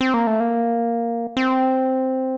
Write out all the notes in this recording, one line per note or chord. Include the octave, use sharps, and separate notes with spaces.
C4
A#3
A3
A#3
C4